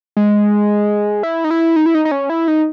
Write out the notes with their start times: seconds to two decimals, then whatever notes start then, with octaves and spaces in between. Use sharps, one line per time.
0.17 G#3
1.23 E4
1.44 D#4
1.51 E4
1.76 D#4
1.86 E4
1.95 D#4
2.05 D#4
2.12 C#4
2.30 E4
2.48 D#4